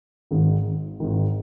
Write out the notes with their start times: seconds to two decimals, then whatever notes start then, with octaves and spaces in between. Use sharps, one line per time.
0.31 G#1 G#2 D#3
1.00 G#1 G#2 D#3